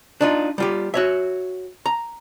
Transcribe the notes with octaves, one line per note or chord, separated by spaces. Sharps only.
D4 D#4 F4
G3 F4 G4
F#4 C#5 E5
A#5